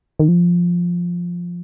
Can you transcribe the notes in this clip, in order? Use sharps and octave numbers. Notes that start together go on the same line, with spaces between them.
D#3
F3